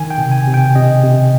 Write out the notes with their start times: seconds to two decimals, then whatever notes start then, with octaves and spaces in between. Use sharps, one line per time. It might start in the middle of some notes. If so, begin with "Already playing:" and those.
Already playing: D#3 G#5
0.10 G5
0.18 C3
0.32 G#5
0.47 C3
0.54 G5
0.75 C3 D#5
1.03 C3